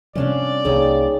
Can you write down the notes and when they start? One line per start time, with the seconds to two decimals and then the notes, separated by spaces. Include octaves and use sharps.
0.15 C3 F3 G3 C#4 D4 D5 F5
0.65 C2 G3 A#3 D#4 G#4 A4 C#5